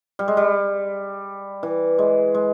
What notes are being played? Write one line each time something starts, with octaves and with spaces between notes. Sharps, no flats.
G3
G#3
G3
E3
G#3
G#3